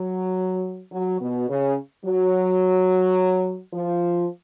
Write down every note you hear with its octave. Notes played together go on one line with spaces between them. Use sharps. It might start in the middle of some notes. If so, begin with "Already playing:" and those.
Already playing: F#3
F#3
B2
C#3
F#3
F3